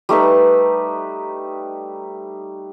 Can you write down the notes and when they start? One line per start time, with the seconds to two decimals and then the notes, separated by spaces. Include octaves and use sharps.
0.09 G3 A3 D#4 B4